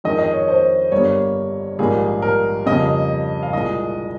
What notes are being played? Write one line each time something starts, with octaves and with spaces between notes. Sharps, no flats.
F2 D#3 G#3 D#5
D#5
C#5
C5
G1 G2 G3 A#3 C#5
A#1 G#2 D#3 G3 A#3 G#4
A#4
F2 C#3 G3 A#3 D#5
F5
C2 A#2 G#3 D#5